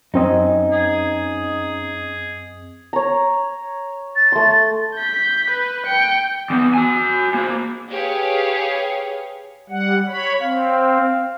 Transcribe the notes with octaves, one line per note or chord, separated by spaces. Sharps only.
F#2 C4 C#4 D#4 D#5
G#4
C#5 A#5
A6
A3 C6
G6 B6
B4
G5 C#7
E2 B3
F#4 G#5
A#3 C5
G4 G#4 B4 C#5 F5
G3 F#5
C#5 B5
C4 F5